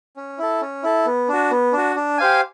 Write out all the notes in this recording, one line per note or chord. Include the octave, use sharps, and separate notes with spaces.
C#4
E4 A4
C#4
E4 A4
B3
D4 F#4
B3
D4 F#4
D4
G4 C5 F5 G#5